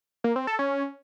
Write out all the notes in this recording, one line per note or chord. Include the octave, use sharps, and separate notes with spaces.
A#3
C4
A4
C#4